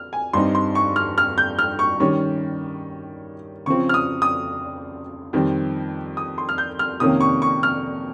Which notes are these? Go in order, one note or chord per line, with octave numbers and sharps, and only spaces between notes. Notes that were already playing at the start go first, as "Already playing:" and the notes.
Already playing: F6
G#5
G2 G3 C4 D#4 C6
C6
C#6
F6
F6
G6
F6
C#6
D#3 G3 C#4 C#6
C#3 F3 C4 C#6
F6
D#6
D#6
F2 D#3 G3 C4
D#6
C6
F6
G6
F6
F2 C3 D#3 A#3 C#4 D#6
C#6
C#6
F6